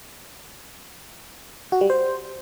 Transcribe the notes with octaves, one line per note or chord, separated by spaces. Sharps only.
F#4
G3
C5